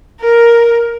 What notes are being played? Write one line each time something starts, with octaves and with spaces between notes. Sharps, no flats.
A#4